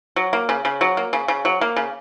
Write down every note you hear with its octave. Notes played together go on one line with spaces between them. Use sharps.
F#3
A#3
C#3
C#3
F#3
A#3
C#3
C#3
F#3
A#3
C#3